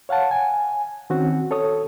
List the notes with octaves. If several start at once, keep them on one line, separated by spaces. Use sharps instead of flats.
C#5 F5 F#5 A5
G#5
D#3 C4 C#4 F#4
A4 C#5 D#6